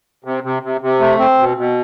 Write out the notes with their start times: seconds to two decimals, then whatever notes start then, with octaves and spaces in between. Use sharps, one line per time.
0.24 C3
0.44 C3
0.63 C3
0.81 C3
1.00 A3
1.19 C4
1.38 B2
1.57 B2